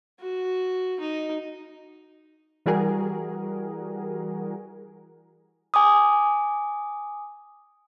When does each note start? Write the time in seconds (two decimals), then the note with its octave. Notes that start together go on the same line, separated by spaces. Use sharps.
0.20 F#4
1.00 D#4
2.66 E3 G3 F#4 G#4 A#4
5.74 G#5 D6 D#6